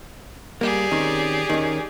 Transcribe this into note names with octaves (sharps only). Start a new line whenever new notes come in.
G3 A#3 G4 G#4 D5
D#3 C4 C#4
D#3 C#4